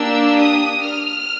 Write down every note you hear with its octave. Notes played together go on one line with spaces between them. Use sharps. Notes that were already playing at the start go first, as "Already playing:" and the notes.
Already playing: A#3 D4 G4 E6
D#6
F6